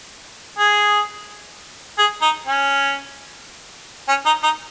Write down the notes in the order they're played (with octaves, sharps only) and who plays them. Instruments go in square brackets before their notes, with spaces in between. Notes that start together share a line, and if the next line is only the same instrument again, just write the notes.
[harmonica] G#4
G#4
D#4
C#4
C#4
D#4
D#4